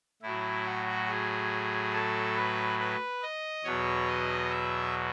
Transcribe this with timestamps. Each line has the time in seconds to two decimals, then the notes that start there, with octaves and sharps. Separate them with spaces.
0.22 A2 F#3 E4
0.66 F#4
1.08 G#4
1.93 A4
2.36 B4
2.79 B4
3.22 D#5
3.64 E2 B2 F#3 C#5
4.07 D#5
4.50 E5